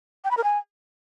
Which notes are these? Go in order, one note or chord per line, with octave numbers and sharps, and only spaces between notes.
G5
B5
A#4
G#5